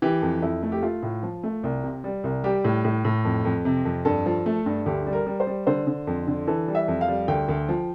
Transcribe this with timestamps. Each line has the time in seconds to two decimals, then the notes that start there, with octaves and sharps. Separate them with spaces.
0.02 E3 G4
0.22 F2
0.42 F2 E4
0.63 A3
0.72 G4
0.82 A3 F4
1.03 A2
1.23 F3
1.43 A3
1.63 C2
1.83 C3
2.04 G3
2.24 C2
2.44 G3 G4
2.64 A2
2.84 A2
3.04 A2
3.25 F2
3.45 F2
3.65 C3
3.85 F2
4.05 G2 A4
4.26 F3
4.46 A3
4.66 G2
4.86 D2 G4
5.06 G3
5.13 A#4
5.26 G3
5.40 C5
5.47 G3
5.67 D3 C5
5.87 D3
6.07 F2
6.27 D3
6.47 E3 A4
6.68 G3
6.75 E5
6.88 F2
7.01 F5
7.08 G3
7.28 D2 G5
7.49 D2
7.69 F3